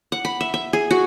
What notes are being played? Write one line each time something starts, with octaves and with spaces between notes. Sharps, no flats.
F#5
B5
E5
E5
G#4
F#4